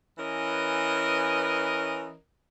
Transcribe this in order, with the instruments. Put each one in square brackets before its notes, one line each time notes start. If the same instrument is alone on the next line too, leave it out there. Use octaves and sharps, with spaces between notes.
[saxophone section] E3 C#4 A#4 B4 D#5